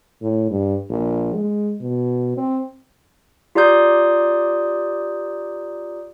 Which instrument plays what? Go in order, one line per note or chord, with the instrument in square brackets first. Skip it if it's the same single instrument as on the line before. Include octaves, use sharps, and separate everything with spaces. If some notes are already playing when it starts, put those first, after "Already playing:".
[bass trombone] A2
G2
A#1
G#3
B2
C4
[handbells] F4 G4 D5 A#5 D#6 G6